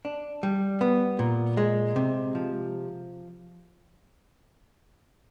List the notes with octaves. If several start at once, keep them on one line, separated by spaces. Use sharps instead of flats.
D4
G3
B3
A#2
G#3
C3
F3